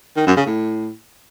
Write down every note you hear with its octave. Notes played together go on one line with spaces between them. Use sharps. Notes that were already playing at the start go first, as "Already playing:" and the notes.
D#3
F#2
C#3
A2